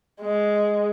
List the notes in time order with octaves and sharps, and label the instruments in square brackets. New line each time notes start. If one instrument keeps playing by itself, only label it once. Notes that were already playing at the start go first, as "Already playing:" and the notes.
[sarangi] G#3